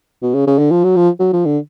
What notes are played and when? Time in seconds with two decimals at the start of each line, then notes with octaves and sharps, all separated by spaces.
0.22 B2
0.34 C#3
0.47 C#3
0.58 D3
0.71 F3
0.84 F#3
0.96 F3
1.20 F#3
1.33 F3
1.45 D3